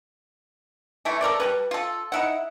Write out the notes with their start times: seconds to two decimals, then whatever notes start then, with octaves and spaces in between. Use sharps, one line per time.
1.05 E3 A3 E4
1.21 A4 A#4 C5 D5
1.40 G3 C#4 B4
1.71 F4 A4
2.12 D#4 E4 F#5